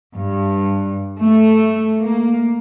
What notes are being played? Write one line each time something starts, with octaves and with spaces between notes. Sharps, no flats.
G2
A3
A#3